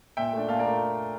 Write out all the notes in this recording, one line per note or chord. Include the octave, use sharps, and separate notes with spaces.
A#2 E5 G5
A3 D4
A#2 F5 A5
A#4 D5
A3